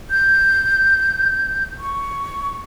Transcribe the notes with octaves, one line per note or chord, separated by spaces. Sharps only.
G6
C#6